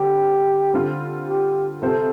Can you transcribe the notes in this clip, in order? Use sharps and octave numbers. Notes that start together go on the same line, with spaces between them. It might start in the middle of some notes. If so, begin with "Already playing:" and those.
Already playing: D3 G3 C4 G4
D3 G3 C4 F4
G4
C3 G3 C4 F4 A4 C5